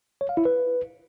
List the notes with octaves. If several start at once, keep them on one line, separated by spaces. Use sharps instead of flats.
C#5
F5
E4
B4